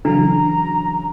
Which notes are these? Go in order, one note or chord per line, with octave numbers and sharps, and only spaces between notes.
C#3 E3 F#3 D4 A#5